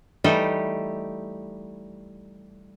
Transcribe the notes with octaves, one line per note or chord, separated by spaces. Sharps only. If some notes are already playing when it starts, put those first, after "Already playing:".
E3 G3 A3 D#4 G4 A4